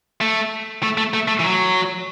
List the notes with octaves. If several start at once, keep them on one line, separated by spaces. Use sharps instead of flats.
A3
A3
A3
A3
A3
E3
F#3